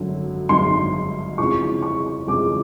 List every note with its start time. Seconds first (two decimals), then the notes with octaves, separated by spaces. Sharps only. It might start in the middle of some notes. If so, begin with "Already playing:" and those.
Already playing: G#1 F#2 D3 F#3
0.49 G#1 F#2 D3 F#3 C6
1.38 F2 C#3 E3 G#3 C#6
1.83 C#6
2.27 F2 C#3 E3 G#3 D6